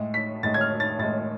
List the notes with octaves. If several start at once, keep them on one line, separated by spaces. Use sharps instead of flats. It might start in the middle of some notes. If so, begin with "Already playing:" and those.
Already playing: A2 G#3
B6
A2 G#3 A6
G#6
F6
A6
A2 G#3 A6